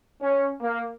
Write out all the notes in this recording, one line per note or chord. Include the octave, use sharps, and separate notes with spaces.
C#4
A#3